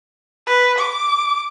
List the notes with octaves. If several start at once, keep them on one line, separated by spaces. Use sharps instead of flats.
B4
D6